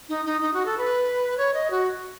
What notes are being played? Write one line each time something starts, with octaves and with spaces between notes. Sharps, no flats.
D#4
D#4
D#4
F#4
A4
B4
C#5
D#5
F#4